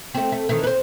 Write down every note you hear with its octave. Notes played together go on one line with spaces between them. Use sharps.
A3 C4
A3
D#3 E3 A3
B4 C5